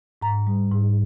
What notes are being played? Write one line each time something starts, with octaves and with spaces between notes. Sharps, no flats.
G#2 A#5
G3
G#2